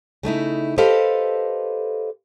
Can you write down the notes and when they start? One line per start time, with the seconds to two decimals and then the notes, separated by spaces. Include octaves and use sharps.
0.23 C#3 A3 D#4 E4
0.78 G4 A4 B4 C5 D#5 F5